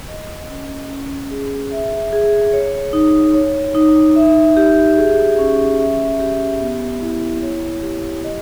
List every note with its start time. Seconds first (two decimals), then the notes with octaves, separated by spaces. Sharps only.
0.08 D#5
0.49 C#4
0.90 C#4
1.31 G#4
1.72 E5
2.13 G#4
2.53 C#5
2.93 D#4
3.34 C#5
3.75 D#4
4.16 E5
4.57 G4
4.98 G#4
5.39 C#4
5.79 E5
6.19 G4
6.60 B3
7.01 E4
7.42 C#5
7.82 G4
8.24 D#5